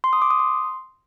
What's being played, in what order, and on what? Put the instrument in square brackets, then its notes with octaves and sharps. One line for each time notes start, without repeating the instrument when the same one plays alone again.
[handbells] C6
D#6
D6
D#6
C6